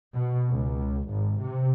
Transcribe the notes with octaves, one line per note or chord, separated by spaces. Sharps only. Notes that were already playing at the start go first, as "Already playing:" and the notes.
B2
C#2
G#1
C3